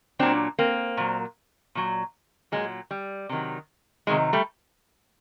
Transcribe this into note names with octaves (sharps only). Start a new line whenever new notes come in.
A#2 F#3 C4 D4
A#3 C4
A#2 F#3
A#2 F#3
A#2 F#3 G#3
G3
C3 D#3 F#3
C3 D#3 F#3 G#3
G3 A3